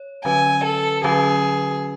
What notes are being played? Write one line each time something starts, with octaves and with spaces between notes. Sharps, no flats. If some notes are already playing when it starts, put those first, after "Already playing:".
Already playing: C#5
D3 F#3 C#4 F#4 B4 G#5
A4
D3 F#3 C#4 F#4 G#4 B4